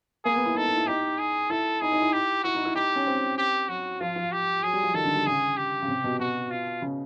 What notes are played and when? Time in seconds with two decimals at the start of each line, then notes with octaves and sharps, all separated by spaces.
0.25 A#3 G#4
0.36 B3
0.46 E4
0.55 D#4 A4
0.67 D#4
0.77 E4
0.87 D#4 G4
1.19 G#4
1.50 E4 A4
1.81 D#4 G#4
1.92 D#4
2.02 E4
2.13 G4
2.44 E4 F#4
2.55 D#4
2.65 E4
2.75 D#4 G4
2.96 C#4
3.07 C4
3.38 G4
3.69 F#3 F#4
4.01 F3 F4
4.16 F3
4.32 G4
4.63 F#3 G#4
4.73 G3
4.83 F3
4.94 D#3 A4
5.05 D3
5.15 G3
5.26 C#3 G#4
5.57 G4
5.82 C#3
5.88 C3
6.04 B2
6.19 B2 F#4
6.51 F4
6.82 C#3